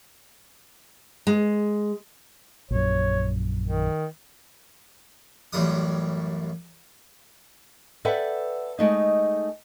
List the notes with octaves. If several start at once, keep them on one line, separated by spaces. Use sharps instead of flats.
G#3
A#1 F#2 C#5
D#3
A1 F#2 A2 G3 D#6
A4 B4 D5 E5 F#5 G5
G#3 A3 D#4